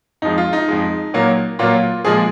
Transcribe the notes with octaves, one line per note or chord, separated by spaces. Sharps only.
F2 F3 G#3 D#4
F4
D#4
F2 F3 G#3
A#2 F#3 A#3
A#2 F#3 A#3 F4
A#2 F3 G#3 G#4